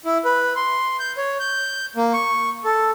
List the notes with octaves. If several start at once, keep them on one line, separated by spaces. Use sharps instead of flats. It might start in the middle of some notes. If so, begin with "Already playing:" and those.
E4
B4
C6
G6
C#5
G6
A#3
C#6
A4